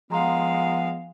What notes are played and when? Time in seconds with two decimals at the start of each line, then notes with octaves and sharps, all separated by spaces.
0.11 F3 G#3 B3 F5 G#5 A#5 C6